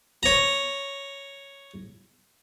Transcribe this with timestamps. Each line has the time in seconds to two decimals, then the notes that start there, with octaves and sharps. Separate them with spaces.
0.23 C#5 A#5